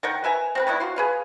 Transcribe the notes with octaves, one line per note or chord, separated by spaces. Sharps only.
D#3 A#4 F#5 G5
B4 E5 G#5 A#5
C4 A#4 B4
D#3 B3 D4 E4
F4 F#4 C6
G#4 B4 F5